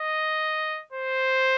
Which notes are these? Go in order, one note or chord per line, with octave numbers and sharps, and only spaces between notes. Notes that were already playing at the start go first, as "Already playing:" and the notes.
Already playing: D#5
C5